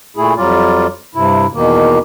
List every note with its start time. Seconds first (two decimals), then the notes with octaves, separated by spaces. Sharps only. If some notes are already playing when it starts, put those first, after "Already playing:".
0.17 A#2 A3 E4 G#4
0.37 F2 F#3 G3 F4 D5
1.15 G2 C3 E4
1.54 E2 B2 D#3 A#3